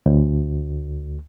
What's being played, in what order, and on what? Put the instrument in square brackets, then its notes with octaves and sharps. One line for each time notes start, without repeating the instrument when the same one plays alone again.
[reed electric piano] D2